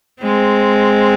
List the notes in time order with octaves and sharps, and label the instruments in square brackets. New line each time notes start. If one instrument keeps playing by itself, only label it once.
[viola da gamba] G#3 C4